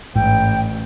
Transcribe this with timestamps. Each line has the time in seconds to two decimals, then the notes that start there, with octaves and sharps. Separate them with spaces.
0.16 A1 G#2 G5